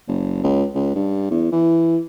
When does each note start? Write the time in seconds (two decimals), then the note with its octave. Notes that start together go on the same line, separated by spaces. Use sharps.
0.08 F#1
0.43 C#2
0.75 C#2
0.95 G2
1.31 E2
1.52 E3